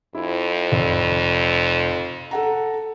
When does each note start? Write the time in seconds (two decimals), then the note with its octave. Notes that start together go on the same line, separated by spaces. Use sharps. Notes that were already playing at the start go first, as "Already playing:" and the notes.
0.15 F2 E4
0.72 F1
2.31 A4 F#5 A#5